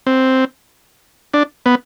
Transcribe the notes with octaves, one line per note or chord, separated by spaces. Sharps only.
C4
D4
B3